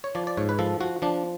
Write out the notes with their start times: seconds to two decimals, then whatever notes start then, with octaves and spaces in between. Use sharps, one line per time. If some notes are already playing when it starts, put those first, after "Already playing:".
0.04 C#5
0.15 F3 D5
0.27 D5
0.37 G#2 C#5
0.49 B4
0.59 F3 A4
0.80 F3 F#4
1.02 F3 D4